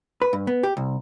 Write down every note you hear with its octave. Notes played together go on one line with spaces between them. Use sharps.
B4
G2
B3
G4
C2